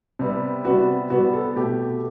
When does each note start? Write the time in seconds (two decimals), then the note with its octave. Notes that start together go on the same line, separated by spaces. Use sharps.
0.19 C3 G3 B3
0.65 C3 G3 B3 F#4
1.10 C3 G3 B3 F#4
1.34 A4
1.56 B2 A3 G4